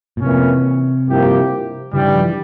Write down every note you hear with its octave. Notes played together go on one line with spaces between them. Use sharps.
A#2
F2 C3 E3 A#3 C#4
G2 F3 A#3 E4 G4
G2 C#3 E3 G3
F3